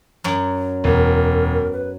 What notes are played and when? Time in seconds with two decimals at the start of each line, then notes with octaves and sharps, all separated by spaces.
0.24 F#2 F#3
0.84 E1 A#4
1.73 B4